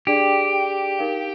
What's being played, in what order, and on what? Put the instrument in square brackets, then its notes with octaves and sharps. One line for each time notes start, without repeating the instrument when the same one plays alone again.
[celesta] D4 G#4 D5 G5 [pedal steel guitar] G4
[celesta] D#4 A#4 F5